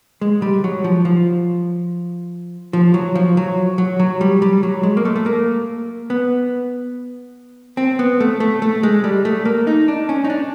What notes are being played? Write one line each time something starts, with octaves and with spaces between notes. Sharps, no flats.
G#3
G3
F#3
F3
F3
F3
F#3
F3
F#3
F#3
F#3
G3
G3
F#3
G#3
A#3
A3
A3
A#3
B3
C4
B3
A3
A3
A3
G#3
G3
A3
A#3
D#4
D4
C#4
D#4
D4